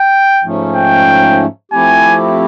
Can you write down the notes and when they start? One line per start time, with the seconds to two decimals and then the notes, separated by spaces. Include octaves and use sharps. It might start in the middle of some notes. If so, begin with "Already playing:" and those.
Already playing: G5
0.43 G#2 F3 A3 C#4
0.75 G5
1.72 F3 A3 C4 E4 G4 G#5